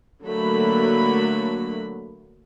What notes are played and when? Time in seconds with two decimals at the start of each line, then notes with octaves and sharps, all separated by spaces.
0.24 D3 F#3 A3 A#3 B5